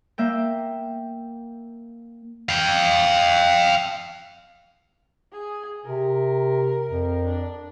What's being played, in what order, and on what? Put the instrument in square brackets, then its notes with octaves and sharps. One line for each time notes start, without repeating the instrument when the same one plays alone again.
[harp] A#3 E5 G5
[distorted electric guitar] F5 G5
[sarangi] G#4
[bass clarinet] C3 [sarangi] A#4
[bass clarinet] F2
[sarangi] D4